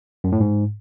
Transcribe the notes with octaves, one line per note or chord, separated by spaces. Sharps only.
F#2
A2
G#2